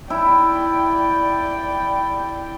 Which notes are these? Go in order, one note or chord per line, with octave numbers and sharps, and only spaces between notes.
E4 D5 G5